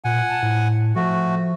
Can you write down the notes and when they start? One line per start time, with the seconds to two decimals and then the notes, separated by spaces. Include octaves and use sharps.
0.04 A#2 F#5 G#5
0.30 A5
0.43 A2
0.95 F3 A3 F#4